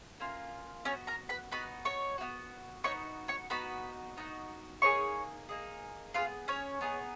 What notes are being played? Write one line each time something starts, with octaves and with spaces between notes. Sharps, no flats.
A#3 C#4 F4
B3 C#4 F#4 C#5
A#4 A#5
B4 B5
B3 D#4 F#4 B4 B5
C#5 C#6
B3 D#4 F#4
B3 D#4 F#4 C#5 C#6
C#5 C#6
B3 D#4 F#4 B4 B5
B3 D#4 F#4
A#3 D#4 G#4 C#5 C#6
A#3 D#4 G#4
B3 D#4 F4 G#4 F5
C#4 C#5
B3 D#4 G#4